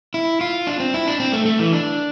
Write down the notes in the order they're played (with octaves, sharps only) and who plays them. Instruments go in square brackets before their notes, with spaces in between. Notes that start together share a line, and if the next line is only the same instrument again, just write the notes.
[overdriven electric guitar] E4
F4
D4
C4
E4
D4
C4
A3
A3
E3
D4